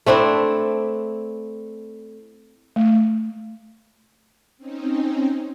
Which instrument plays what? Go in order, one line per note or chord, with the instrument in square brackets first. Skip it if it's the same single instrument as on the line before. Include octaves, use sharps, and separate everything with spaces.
[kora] A3 C4 D4 E4
[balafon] A3
[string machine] C4 C#4 D#4